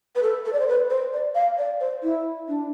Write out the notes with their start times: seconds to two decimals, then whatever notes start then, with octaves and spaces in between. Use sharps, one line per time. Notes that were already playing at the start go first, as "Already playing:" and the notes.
0.15 B4
0.22 A4
0.45 A4
0.53 D5
0.60 C5
0.68 B4
0.90 C5
1.13 D5
1.35 F5
1.58 D5
1.80 C5
2.03 E4
2.48 D4